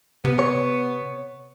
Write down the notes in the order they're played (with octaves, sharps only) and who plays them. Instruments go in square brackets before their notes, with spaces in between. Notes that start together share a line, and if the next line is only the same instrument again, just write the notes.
[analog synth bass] C3 [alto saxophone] B3
[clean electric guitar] C#5